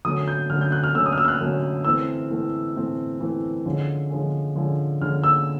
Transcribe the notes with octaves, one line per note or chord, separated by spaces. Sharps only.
D3 F#3 A3 C#4 D#6
G6
D3 F#3 A3 C#4 F6
G6
F#6
F6
D3 F#3 A3 C#4 E6
D#6
F6
E6
F6
F#6
D3 F#3 A3 C#4
E3 A3 C4 E6
E3 A3 C4
E3 A3 C4
E3 A3 C4
D3 F3 G#3 C#4
D3 F3 G#3 C#4
D3 F3 G#3 C#4
D3 F3 G#3 C#4 F6
E6